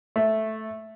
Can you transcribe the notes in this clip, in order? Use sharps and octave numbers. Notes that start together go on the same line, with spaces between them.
A3